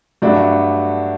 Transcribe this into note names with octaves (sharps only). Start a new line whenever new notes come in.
G2 F#3 A3 D4 F#4